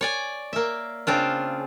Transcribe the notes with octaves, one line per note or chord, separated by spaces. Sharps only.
C#5 D5 G#5
A#3 E5
C#3 C4 D4 F4